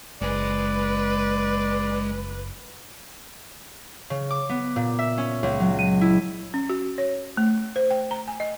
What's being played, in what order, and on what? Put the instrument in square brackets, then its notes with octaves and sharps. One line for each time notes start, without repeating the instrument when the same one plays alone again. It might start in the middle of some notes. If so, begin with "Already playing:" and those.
[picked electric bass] F#1 [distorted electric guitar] G#3 G#5 [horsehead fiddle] B4 [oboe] D5
[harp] C#3
D6
B3
A#2
E5
C#4
C#2
F#3
D#7
E4
[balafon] C#4
F#4
C#5
A3
C5
G5
A#5
G#5
D#5